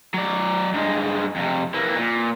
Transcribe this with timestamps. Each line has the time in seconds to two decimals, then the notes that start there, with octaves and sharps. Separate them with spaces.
0.14 F#3 D5
0.74 G2 G#3
1.36 F2 C3
1.74 E3 A#3
1.96 A#2